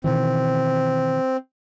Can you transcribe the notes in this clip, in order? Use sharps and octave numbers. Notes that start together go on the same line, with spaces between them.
B2 D#3 E3 C4